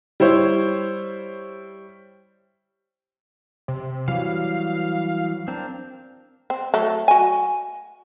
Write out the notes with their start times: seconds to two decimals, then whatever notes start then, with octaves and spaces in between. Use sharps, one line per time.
0.20 G3 E4 C5 C#5
3.68 C3
4.08 E3 F#3 G3 F5
5.48 C4 D4 A#4
6.50 C4
6.74 F#3 A3
7.08 F#4 G#5